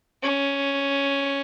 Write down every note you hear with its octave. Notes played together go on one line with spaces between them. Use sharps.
C#4